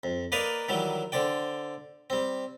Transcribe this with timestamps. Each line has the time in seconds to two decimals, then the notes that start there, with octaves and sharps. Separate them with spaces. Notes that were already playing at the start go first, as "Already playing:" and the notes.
0.03 F2
0.32 A#3 A#4 B4 D5 D#5 F5
0.69 D#3 E3 F#3 G3
1.12 D3 C5 D5 G5
2.10 G3 C4